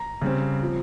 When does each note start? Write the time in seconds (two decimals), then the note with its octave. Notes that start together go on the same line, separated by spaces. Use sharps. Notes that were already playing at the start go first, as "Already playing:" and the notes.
Already playing: A#5
0.21 C#3 G3 C4
0.61 F3 C4